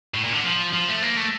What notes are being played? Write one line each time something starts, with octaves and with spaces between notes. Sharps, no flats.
A2
A#2
D3
F3
F3
A3
A#3
A3